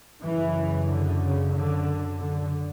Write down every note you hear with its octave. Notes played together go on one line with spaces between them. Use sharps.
F#2 C#3 E3
D3
C#3
D3
D3